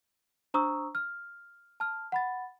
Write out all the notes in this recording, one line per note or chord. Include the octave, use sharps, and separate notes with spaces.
D4 C5 A#5 C#6 D#6 E6
F6
A5 F6
F#5 B5 A6